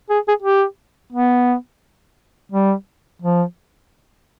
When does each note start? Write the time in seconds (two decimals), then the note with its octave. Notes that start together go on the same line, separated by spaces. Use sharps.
0.09 G#4
0.28 G#4
0.42 G4
1.12 B3
2.52 G3
3.22 F3